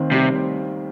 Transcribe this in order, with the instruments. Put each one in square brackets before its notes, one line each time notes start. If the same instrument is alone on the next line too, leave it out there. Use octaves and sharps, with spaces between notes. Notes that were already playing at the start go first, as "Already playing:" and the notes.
Already playing: [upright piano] D#2 D#3 C4
[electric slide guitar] C3 [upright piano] G3
[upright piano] C4